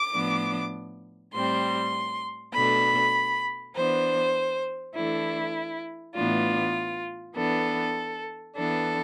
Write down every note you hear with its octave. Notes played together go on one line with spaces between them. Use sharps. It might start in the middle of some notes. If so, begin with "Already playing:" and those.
Already playing: D6
A2 F3 B3 D4
A2 G3 C4 C6
B2 A3 D4 B5
E3 B3 D4 C5
E3 A3 D4 E4
A2 E3 B3 D4 F4
E3 B3 D4 A4
E3 B3 D4 A4